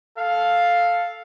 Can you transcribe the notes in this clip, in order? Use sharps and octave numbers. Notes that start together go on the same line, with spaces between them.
A4 F5